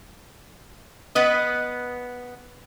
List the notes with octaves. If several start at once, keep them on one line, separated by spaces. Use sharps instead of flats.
B3 B4 D#5